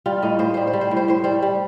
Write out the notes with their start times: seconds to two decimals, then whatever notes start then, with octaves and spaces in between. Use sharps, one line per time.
0.06 G3 F4
0.22 A2 D#4
0.39 A2 C5
0.54 G3 C5
0.67 C5
0.73 G3
0.81 C5
0.91 A2
0.97 C5
1.08 A2 C5
1.24 G3 C5
1.42 G3